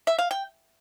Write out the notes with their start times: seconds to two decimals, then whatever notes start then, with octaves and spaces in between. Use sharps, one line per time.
0.07 E5
0.18 F5
0.31 G5